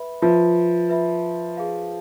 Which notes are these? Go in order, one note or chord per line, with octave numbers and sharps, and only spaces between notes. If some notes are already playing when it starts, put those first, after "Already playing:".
Already playing: B4 E5 B5
F3 B4 E5 B5
B4 E5 B5
G#4 B4 F5